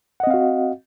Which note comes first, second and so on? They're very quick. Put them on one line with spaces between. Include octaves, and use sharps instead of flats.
F#5 D#5 C4 F5 F#4